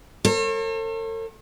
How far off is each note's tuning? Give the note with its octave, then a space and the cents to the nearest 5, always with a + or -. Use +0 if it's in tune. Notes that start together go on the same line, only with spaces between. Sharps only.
A4 +45 C#5 -45